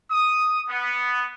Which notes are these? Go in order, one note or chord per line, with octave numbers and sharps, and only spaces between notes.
D#6
B3